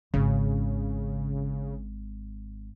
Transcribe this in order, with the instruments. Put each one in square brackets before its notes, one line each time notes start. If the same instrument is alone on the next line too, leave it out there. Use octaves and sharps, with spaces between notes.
[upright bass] G#1 [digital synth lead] C#3